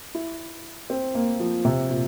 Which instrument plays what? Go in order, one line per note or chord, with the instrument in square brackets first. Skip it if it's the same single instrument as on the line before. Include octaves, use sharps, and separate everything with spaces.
[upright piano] E4
C4
A#3
F3
C3
A#2